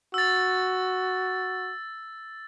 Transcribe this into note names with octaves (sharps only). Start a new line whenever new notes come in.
F#4 E6 A6